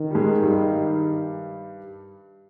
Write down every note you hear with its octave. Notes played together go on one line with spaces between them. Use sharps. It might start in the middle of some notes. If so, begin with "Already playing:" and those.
Already playing: D#3
G3
G#2 G#3
G2 G3